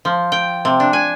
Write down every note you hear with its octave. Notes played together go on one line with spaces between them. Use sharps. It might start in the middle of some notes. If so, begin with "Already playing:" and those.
F3
G5
C3
D4
G#5